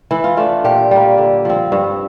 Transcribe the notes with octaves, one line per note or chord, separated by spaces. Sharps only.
E3 E4
F4
A3 D4 F4
A#2 G4
G3 A#3
D3
F3 C4
G2